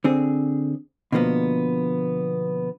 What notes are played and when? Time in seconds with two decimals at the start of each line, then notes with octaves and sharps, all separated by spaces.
0.04 D3 C4 G#4
1.12 B2 D3 F3 A#3 B3